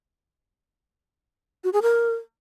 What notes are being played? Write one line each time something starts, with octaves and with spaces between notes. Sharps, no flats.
F#4
G#4
A#4